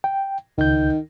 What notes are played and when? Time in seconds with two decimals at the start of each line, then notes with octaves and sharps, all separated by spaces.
0.04 G5
0.58 C#2 D#3 G6